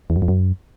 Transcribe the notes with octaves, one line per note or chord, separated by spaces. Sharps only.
E2
F#2
F2
F#2